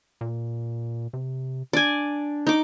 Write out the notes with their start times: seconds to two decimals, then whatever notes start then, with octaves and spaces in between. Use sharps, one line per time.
0.21 A#2
1.13 C3
1.73 D4 D5 G#5
2.47 D#4 D6